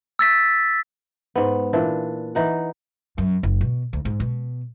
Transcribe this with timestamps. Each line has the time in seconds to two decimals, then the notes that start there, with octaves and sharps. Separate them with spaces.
0.19 E6 A6 B6
1.36 G#2 B3
1.73 A#2 E3 D4
2.35 E3 D#4 F#5
3.18 F#2
3.43 F#1
3.61 B2
3.93 D2
4.05 G#2
4.20 B2